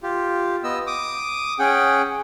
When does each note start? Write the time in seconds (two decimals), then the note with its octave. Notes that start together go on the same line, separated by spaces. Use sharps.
0.03 F4 G4
0.64 B3 D#5 E6
0.87 D6 D#6
1.59 C#4 G#4 F#5 G5